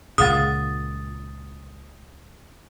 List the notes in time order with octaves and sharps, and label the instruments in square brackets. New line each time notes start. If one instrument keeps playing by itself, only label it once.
[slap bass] C#2 A#2 [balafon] G#4 F5 F#5 [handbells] D#6 A6